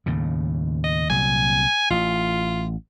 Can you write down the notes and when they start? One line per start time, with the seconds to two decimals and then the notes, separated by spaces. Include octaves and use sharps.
0.06 D#2 A2 C#3
0.84 D#5
1.10 C2 A#2 F#3 G#5
1.90 A1 F4